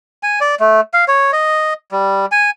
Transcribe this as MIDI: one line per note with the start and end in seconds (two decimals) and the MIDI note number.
0.23 0.39 80
0.41 0.55 74
0.60 0.81 57
0.94 1.05 77
1.08 1.31 73
1.33 1.74 75
1.92 2.26 55
2.32 2.50 80